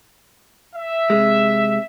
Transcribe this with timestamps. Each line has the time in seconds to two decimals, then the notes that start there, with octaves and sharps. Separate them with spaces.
0.75 E5
1.10 C3 G#3